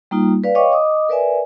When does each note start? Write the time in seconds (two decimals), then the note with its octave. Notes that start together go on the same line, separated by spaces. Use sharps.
0.11 G3 A#3 D#4 F4
0.44 B4 D5 F5
0.55 C#5 D#5 F5 G5 C#6 D6
0.72 D#5 D6 D#6
1.09 A#4 B4 D5 E5 G#5